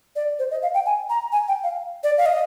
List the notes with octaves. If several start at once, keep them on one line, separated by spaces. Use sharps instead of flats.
D5
C5
D#5
F5
G5
G#5
A#5
G#5
G5
F5
D5
F5
D#5